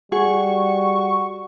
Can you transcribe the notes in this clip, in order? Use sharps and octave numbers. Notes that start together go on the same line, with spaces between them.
G3 F#4 G#4 C#6